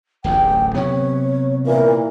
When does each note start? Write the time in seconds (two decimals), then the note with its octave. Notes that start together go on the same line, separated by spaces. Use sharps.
0.24 D1 A1 E2 G5
0.75 C3 F#3 B3 C#5
1.65 A#2 E3 A#4